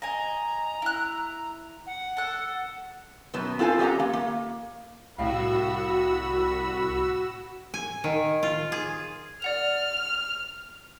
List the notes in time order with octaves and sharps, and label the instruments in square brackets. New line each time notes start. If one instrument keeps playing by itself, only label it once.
[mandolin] D#5 G#5 [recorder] A#5
[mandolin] E4 F#6
[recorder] F#5
[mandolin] A4 F#6
[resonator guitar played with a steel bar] F#2 B2 B3
C4 F4 A4 F#5 G#5
C#4 G4 D#5 F#5 A#5
A#3
A#3
[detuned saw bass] C2 [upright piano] A2 F5 [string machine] F#4 E6 [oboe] B5
[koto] G#5
D#3
F4
G#4
[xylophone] D5 F#5 F7 [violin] F6